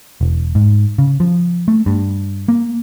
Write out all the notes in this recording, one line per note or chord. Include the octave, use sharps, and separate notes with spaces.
E1
G#2
C#3
F3
A3
G2
A#3